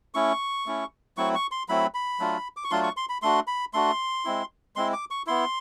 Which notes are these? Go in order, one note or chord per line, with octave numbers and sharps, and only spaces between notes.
A3 C#4 E4 C#6
A3 C#4 E4
F#3 A3 C4 E4 C#6
C#6
C6
F#3 A3 C4 E4 B5
B5
F#3 A3 D4 F4
D6
C#6
F#3 A3 D4 F4 C6
C#6
C6
B5
A3 D4 F#4 C6
B5
A3 D4 F#4 C6
G#3 C4 E4
G#3 C4 E4 C6
D6
C#6
B3 E4 C6